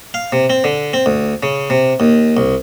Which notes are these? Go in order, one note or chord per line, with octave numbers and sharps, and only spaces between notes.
F5
C3
C4
D3
C4
D2
C#3
C3
D#2
C2